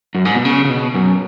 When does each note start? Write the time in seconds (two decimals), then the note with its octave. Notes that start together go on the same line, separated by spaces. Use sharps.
0.15 F#2
0.25 G#2
0.35 B2
0.45 C#3
0.65 C#3
0.70 B2
0.95 F#2